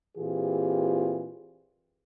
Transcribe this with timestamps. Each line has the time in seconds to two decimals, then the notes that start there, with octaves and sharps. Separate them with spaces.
0.17 A#2 E3 C4 F4 G4 G#4